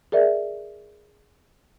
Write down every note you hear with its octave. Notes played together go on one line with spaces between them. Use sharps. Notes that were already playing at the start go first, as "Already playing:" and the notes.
G#4 A#4 D5 E5